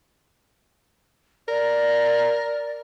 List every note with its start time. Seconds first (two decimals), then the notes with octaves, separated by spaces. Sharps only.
1.48 A#4 D5